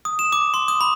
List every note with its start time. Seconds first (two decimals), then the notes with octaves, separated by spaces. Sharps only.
0.05 D#6
0.19 E7
0.32 D6
0.54 C6
0.68 D#6
0.81 B5